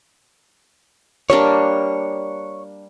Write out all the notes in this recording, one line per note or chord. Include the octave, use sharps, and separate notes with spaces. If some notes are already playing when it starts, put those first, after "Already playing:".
G3 A#3 D4 C#5